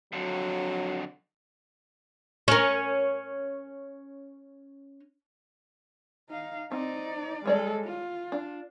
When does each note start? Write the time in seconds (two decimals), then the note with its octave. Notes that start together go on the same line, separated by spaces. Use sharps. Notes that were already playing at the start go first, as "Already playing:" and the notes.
0.13 F2 D3 F#3
2.48 C#4 A#4
6.30 D#4 F5
6.72 C4 D#4 D5
7.46 G3 G#3 A4 C#5 D5
7.85 F4
8.32 D4